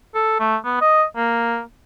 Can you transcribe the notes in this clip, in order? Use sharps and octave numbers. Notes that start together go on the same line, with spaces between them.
A4
A3
B3
D#5
A#3